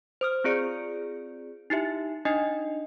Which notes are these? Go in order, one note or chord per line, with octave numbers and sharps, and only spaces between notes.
C5 D#6 F6
C4 F4 G#4 D5 C#7
D#4 E4 G4 E5
D4 D#4 D#5 G#5